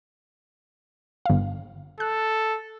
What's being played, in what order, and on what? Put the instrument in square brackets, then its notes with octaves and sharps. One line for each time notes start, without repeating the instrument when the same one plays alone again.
[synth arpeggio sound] G1 F5
[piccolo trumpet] A4 [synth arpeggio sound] F#6